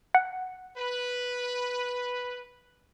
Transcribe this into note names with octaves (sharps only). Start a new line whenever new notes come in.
F#5
B4